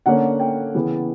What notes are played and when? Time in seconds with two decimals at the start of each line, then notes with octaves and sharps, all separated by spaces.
0.06 D3 A#3 C#4 F#5
0.40 G5
0.75 C#3 E3 B3